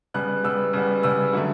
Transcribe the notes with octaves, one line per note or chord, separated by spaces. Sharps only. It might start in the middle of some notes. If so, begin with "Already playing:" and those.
C#3 G3 B3 F#6
C#3 G3 B3 E6
C#3 G3 B3
C#3 G3 B3 E6
D3 F#3 A3